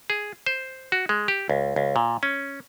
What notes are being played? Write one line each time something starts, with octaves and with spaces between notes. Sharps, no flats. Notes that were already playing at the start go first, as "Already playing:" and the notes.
G#4
C5
F#4
G#3
G4
C#2
C#2
A#2
C#4